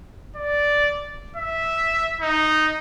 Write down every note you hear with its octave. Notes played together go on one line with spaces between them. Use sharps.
D5
E5
D#4